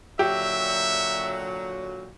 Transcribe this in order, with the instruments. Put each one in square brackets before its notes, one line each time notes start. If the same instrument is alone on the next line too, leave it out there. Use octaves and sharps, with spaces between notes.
[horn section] A#2 D3 F#3 [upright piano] G4 [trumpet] E5